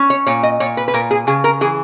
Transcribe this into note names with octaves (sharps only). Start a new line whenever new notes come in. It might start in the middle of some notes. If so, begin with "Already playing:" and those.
Already playing: C#4
C#5
A#2 C#5
D#5
A#2 C#5
B4
B4
A#2 A#4
G#4
C#3 G#4
A#4
E3 G#4